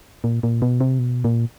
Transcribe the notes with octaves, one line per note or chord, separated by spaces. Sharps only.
A#2
A#2
B2
C3
B2
A#2